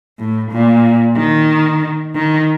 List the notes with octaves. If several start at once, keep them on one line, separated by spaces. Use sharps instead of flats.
A2
A#2
D#3
D#3